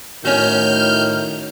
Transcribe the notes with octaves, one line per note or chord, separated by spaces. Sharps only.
A2 D#3 C#4 F#4 F6 G6